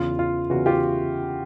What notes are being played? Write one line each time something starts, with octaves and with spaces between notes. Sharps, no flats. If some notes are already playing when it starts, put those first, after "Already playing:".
Already playing: E2 C#3 E3 F4
F4
E2 C#3 E3 F#4
F4 G4